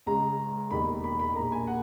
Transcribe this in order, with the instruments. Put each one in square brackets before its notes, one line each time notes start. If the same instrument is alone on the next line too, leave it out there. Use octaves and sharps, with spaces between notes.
[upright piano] C#2 C#3 G#3 A#5
E1 D#2 D#3 B5
B5
B5
A#1 A#2 A#3 A#5
G#5
F#5